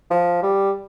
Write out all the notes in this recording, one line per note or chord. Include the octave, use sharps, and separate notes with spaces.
F3
G3